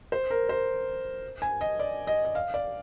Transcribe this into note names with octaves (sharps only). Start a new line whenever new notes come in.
C5
A#4
C5
G#5
D#5
D5
D#5
D#5
F5
D5